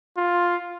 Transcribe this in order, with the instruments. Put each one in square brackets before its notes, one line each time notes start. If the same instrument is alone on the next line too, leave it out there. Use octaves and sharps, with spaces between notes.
[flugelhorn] F4